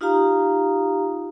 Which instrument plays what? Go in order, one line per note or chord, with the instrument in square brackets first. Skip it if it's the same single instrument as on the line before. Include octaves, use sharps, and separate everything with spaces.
[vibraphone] D#4 F4 G4 F5 A#5 D#6